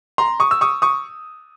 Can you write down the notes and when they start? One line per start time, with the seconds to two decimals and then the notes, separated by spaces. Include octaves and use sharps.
0.18 A#5 C6
0.40 C#6 D#6
0.51 E6
0.61 C#6 D#6
0.82 C#6 D#6